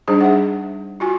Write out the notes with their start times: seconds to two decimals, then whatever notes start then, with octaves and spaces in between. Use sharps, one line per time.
0.08 G3 D4 D#4 G#4 C5
0.21 E5 F#5
1.00 F4 F#4 G#5